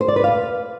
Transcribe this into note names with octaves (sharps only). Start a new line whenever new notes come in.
C5
D5
B4
F5